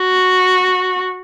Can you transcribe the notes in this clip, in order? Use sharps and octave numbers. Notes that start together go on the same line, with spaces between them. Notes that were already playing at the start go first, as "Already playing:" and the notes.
Already playing: F#4